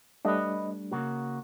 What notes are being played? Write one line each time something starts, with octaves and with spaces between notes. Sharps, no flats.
G3 A3 D4 B4 D#5
C#3 A#3 F#4